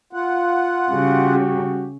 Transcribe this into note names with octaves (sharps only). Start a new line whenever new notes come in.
F4 F#5
C#3 G3 F#4 G4